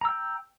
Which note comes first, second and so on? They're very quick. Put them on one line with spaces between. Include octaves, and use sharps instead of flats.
A#5 E6 G5